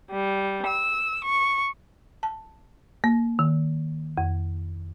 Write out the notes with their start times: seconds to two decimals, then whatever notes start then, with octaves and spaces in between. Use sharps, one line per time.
0.10 G3
0.65 E6
1.24 C#6
2.23 A5
3.04 A#3
3.39 D#3
4.17 F2